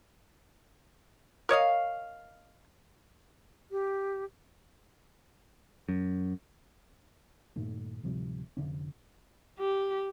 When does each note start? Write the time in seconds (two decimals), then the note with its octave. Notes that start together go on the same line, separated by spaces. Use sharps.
1.49 A#4 C#5 D#5 F5
3.71 G4
5.89 F#2
7.56 G2 A#2 D#3 A3
8.03 D1 C3 F3 G3
8.57 F1 C2 D3 C#4
9.59 G4